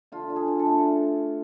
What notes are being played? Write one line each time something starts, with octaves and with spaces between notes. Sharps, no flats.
D3 F4
D4
G#4
D3
A4
A3